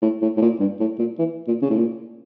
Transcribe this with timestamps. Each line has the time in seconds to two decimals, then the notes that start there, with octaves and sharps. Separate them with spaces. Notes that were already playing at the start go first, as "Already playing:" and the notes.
0.02 A2
0.22 A2
0.37 A2
0.42 A#2
0.60 G2
0.80 A2
0.99 A#2
1.18 E3
1.48 A#2
1.62 C#3
1.70 A2
1.77 A#2